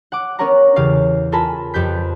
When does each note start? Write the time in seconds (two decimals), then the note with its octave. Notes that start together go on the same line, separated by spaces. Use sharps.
0.12 F#5 D6
0.39 B3 C#4 A#4 C#5 F#5 A#5
0.76 E2 C#3 C#4 G4 F5 C7
1.32 F4 A4 A#4 G#5 A5 B5
1.74 F2 G4 B4 G6 B6